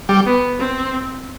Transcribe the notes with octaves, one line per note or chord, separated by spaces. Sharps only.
G3
B3
C4